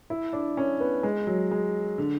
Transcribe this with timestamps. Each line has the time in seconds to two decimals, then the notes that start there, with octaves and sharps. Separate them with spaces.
0.10 E4
0.33 D4
0.57 C#4
0.80 B3
1.03 G#3
1.27 F#3
1.51 G#3
1.98 D3